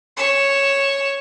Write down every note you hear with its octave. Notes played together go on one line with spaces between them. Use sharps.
C#5 E7